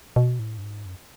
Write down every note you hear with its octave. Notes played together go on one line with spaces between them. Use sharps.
B2
A2
G2
G#2
F#2